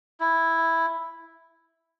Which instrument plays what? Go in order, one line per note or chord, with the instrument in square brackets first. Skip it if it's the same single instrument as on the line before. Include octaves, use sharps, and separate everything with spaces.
[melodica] E4